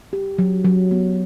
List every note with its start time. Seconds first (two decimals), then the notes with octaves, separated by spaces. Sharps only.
0.13 G4
0.38 F#3
0.65 F#3
0.91 B3